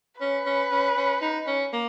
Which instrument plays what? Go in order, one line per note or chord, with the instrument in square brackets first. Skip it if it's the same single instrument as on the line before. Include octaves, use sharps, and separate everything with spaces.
[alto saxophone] C#4 [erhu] B4
[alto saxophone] C#4
C#4
C#4
D#4
C#4
A#3